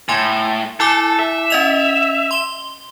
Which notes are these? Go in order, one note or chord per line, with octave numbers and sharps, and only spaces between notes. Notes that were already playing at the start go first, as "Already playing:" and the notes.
A2 G#5 C6
E4 A4 G#5 D6
E5
C#4 D#5 F7
C6 G7